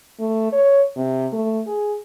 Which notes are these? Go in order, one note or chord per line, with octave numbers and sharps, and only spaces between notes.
A3
C#5
C3
A3
G#4